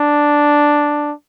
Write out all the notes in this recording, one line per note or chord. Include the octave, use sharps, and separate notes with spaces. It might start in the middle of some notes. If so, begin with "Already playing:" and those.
Already playing: D4